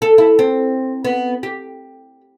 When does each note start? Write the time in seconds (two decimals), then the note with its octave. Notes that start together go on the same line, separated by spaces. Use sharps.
0.02 A4
0.18 E4
0.39 C4
1.05 B3
1.43 G4